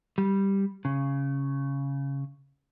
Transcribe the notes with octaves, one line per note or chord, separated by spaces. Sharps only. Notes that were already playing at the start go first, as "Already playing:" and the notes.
G3
C#3